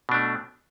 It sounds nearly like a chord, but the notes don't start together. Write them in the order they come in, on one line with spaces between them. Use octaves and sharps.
B2 D4 A3